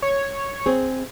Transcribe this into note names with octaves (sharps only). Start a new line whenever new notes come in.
C#5
C4 G#4